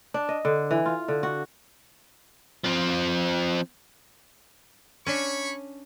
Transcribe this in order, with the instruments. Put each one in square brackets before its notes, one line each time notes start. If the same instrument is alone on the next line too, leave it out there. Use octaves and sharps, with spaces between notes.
[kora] D4
D#5
D3
E3
F4
D3
F#4
[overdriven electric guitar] F3 C4
[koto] C#4 D4 [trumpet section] C#5 B5 C#6